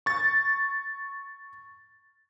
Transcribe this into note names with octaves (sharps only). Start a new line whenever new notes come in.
C#6 A6